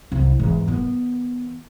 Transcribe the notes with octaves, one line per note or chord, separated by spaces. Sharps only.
C2 E4
E2 G#2
D#3 B3